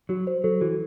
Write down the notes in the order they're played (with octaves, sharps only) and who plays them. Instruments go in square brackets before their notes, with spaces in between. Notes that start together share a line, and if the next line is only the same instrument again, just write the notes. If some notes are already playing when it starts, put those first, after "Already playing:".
[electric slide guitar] F#3 [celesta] F#4
[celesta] C5
[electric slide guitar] F#3 [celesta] A4
[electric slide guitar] E3 [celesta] F#4